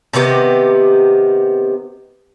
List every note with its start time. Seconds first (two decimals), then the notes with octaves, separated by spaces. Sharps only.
0.13 C3 D#3 B3 G4